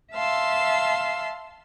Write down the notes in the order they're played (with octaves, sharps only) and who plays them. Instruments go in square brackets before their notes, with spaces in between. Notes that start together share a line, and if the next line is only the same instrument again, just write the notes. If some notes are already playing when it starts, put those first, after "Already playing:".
[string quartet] E5 F5 A5 C6 E6